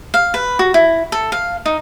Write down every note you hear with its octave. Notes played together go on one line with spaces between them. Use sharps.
F5
B4
F#4
E4
A4
F5
D#4